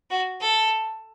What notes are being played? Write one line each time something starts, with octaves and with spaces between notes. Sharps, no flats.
F#4
A4